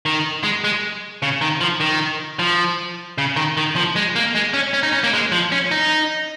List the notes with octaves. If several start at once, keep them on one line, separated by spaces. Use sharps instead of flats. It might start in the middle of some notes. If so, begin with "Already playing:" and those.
D#3
G#3
G#3
C#3
D#3
F3
D#3
F3
C#3
D#3
D#3
F3
G#3
A#3
G#3
C#4
C#4
D#4
C#4
A#3
G#3
F3
C#4
D#4